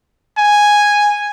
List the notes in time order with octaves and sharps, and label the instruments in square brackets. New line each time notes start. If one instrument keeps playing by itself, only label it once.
[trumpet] G#5